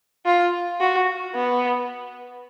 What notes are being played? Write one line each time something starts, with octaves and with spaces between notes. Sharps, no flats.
F4
F#4
B3